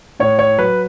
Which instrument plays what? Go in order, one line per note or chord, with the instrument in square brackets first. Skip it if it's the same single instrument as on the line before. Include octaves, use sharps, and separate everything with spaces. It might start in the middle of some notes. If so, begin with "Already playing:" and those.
[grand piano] A2 C#5
C#5
F#3 B4